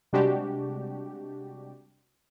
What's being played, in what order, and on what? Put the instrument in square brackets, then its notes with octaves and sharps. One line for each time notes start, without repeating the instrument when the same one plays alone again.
[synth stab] C3 G3 G#3 D4 F#4 G4